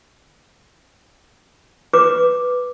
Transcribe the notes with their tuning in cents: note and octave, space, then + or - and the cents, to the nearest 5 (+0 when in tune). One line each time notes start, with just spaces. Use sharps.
B4 +0 D6 +0